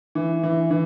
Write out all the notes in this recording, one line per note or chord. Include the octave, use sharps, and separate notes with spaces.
E3
E3
E3